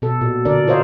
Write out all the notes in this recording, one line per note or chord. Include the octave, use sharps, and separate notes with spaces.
B2 A4
A#2
D3 D4 A#4 D5
F4 A#4 C5 C#5 D#5 F5